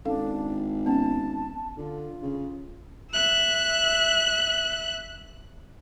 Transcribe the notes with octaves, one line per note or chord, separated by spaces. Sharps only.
G#1 C#4 D4 A4 F5
B3 C#4 A5
D3 F4
C#3
E5 F#6